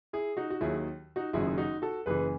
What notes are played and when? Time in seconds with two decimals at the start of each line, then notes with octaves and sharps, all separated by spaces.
0.13 E4 G#4
0.37 D#4 F#4
0.50 F#4
0.61 D#2 D#3 F#3 E4 G#4
1.16 D#4 F#4
1.33 F#1 F#2 D#3 F#3 E4 G#4
1.47 G#4
1.58 D#4 F#4
1.82 F#4 A4
2.06 F#1 F#2 E3 G#4 B4